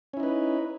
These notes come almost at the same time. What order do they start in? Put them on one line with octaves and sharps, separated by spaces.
C#4 E4 D#4 B4